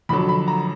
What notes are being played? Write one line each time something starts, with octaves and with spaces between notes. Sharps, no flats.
F2 D3 F#3 B5
B5
A#5